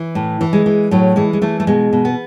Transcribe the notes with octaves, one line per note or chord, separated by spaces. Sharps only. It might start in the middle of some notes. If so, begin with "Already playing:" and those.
Already playing: E3
A2
E3
G#3
E3
A2 F#3
E3 G#3
G#3
E3 A3
A3
B2 G#3
B2
B3